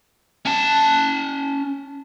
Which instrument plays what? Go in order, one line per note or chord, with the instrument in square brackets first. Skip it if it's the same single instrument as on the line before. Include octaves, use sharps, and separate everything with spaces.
[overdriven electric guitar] C#4 A5